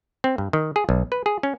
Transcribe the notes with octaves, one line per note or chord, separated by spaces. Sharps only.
C4
G2
D#3
G#4
B1
B4
G#4
C#4